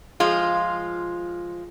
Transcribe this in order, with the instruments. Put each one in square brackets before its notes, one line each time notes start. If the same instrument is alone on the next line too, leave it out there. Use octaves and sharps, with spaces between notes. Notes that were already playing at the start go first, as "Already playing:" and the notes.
[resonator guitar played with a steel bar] F3 G#3 F4